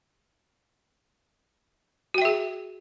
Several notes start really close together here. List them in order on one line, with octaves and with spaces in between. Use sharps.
F#4 G5 E5 G#4